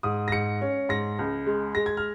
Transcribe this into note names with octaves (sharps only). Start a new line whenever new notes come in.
G#2 D#6
A#6
G#2 C#7
C#4
G#2 A#6
C#2
G#3
G#3 A#6
G#6
F6